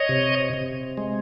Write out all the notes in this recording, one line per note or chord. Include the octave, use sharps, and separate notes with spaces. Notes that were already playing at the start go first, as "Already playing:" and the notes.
Already playing: C#5 D#5
C3
C3
G#3